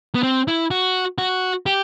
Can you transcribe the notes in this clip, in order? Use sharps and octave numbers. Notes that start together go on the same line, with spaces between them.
B3
C4
E4
F#4
F#4
G4